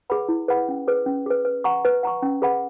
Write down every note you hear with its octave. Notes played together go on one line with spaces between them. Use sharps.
G#4 B4 F#5 B5
E4
G#4 B4 F#5 B5
C#4
G#4 B4
C#4
G#4 B4
B4
F#5 A#5 C#6
B4
F#5 A#5 C#6
C#4
G#4 B4 F#5 B5